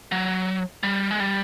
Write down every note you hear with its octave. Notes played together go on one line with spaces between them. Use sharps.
F#3
G3
G#3
G3